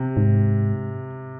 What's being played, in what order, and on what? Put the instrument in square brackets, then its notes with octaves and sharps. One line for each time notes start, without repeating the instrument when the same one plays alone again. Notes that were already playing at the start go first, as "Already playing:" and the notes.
Already playing: [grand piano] C3
[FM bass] G#2